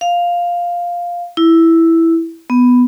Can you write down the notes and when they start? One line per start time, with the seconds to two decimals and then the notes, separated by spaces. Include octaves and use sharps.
0.01 F5
1.37 E4
2.50 B3